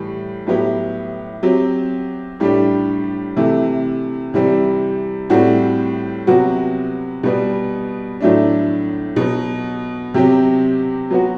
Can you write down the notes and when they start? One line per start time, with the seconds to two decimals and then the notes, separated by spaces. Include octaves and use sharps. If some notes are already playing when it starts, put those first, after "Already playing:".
Already playing: A2 E3 G3
0.47 A2 F#3 B3 E4 G4
1.43 F#3 C4 G4
2.40 A2 G3 D4 G4
3.36 C3 E3 A3
4.34 C3 E3 G3 C4
5.30 A2 G3 C4 F#4
6.27 C3 F#3 B3 F#4
7.23 B2 G3 B3
8.20 A2 F#3 A3 D4
9.16 B2 F#3 B3
10.14 C3 F#3 C4 G4
11.10 F#3 B3 F#4